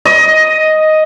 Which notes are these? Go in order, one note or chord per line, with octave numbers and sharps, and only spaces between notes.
D#5